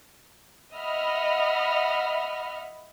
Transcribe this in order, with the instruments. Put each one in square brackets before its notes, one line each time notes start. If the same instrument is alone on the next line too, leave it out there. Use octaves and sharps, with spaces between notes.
[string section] D#5 E5 F#5 B5 F6